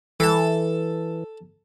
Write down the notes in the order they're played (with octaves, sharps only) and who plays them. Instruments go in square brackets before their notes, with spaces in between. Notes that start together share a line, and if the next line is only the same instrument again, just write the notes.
[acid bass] E3 [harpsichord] A4 A5